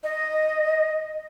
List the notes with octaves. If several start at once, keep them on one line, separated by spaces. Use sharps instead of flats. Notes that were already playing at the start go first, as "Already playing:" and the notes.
D#5